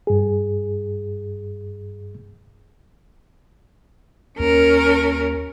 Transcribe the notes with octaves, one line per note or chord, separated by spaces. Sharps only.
G2 G#4
D#2 C#4 A#4